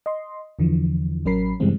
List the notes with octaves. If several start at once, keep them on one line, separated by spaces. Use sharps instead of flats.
D#5 C6
E2 D3 E3 F3
A1 F#3 C#4 A#4 B5 C7
G2 C#3 E3 G3 G#3 C4